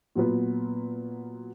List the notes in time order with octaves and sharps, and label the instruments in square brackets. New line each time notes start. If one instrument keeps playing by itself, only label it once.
[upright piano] A#2 F#3 B3 F4 B4